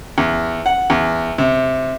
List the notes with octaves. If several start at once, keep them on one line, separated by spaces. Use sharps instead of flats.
E2
F#5
E2
C3